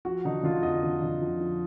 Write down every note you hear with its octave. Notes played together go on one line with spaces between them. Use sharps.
F3 F#4
D3 D#4
D3 F4
F2 D#5
D3
D3
F3
F3